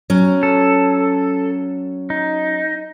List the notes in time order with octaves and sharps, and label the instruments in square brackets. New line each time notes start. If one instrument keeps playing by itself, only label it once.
[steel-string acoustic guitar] F#3 C#4
[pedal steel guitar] A4
D#4